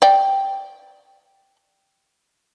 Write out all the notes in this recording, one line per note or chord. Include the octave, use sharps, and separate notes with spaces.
D5 G5